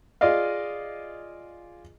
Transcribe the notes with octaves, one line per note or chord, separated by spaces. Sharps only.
F4 G#4 D5 D#5 F5